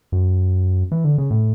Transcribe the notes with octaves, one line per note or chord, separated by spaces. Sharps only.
F#2
E3
D3
C#3
A2